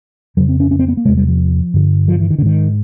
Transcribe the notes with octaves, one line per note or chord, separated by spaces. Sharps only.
F2 C#3 F#3
C4
C#4
C#4
C4
B3
A#3
E2 C3 G#3
G3
F3
G2 D3
F3
E3
D#3
D3
G#2 D#3